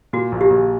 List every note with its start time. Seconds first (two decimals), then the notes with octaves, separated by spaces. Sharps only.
0.13 A#2 F#4
0.32 A#1
0.41 G4
0.50 A#1